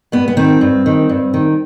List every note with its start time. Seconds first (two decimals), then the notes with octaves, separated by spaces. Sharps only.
0.12 G2 B3
0.28 B3
0.37 D#3 C4
0.61 G2
0.86 D#3
1.09 G2
1.34 D#3